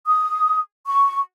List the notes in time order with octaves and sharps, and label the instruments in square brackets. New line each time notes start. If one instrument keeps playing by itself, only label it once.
[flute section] D#6
C#6